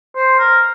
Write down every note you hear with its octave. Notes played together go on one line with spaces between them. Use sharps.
C5
A#4